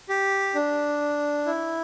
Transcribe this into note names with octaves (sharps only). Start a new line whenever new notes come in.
G4
D4
E4